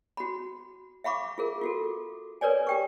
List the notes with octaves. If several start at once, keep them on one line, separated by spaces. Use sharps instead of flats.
F#4 B5
E5 F5 B5 C#6 D6
F4 G#4 A#4
F4 F#4 A4
A#4 B4 C#5 D5 G#5
G4 G5 C#6